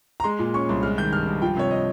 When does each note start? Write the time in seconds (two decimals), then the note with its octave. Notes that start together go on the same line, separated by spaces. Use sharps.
0.20 A#5
0.24 G#3 C6
0.39 A#2
0.54 C#4 C#6
0.69 C2
0.83 G#3 F6
0.98 D#3 G6
1.12 G2 F6
1.27 G2
1.42 F3 G5
1.57 C3 C#5
1.71 D#5